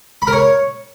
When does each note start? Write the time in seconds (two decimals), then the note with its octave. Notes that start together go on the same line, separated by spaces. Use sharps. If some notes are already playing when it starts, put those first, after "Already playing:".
0.22 B5
0.27 A#4
0.33 C#5